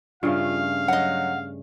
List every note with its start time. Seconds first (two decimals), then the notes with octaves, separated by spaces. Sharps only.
0.23 G2 C#3 A3 F4 F5
0.88 F#3 D#5 F#5